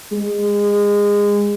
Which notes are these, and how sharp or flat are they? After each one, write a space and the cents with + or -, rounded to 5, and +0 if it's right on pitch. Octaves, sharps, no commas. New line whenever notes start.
G#3 -25